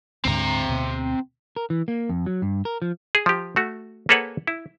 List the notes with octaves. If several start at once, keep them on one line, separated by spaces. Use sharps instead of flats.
D2 G#2 D3 C4 A#5
D2 B2
A#4
E3
A#3
F2
F#3
G2
A#4
F3
G#4
F3 G4
A3 F#4
A#3 G#4 A4 B4 C#5 F#5
E4